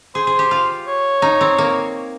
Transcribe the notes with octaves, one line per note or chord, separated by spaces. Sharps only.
G#4 C5
G#4
G4
F4
C#5
D#4
C4
A#3